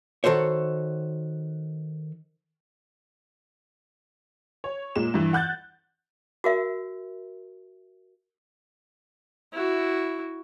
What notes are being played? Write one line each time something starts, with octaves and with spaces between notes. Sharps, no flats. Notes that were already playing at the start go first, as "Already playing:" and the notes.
D#3 F#4 A4 C5 C#5
C#5
A#2 G#3 E7
G2 E3
F#5 F#6 G6 A6
F#4 A#4 E5
E4 F#4